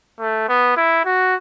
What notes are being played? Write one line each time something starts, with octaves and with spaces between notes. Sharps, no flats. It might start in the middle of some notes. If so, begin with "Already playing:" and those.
A3
B3
E4
F#4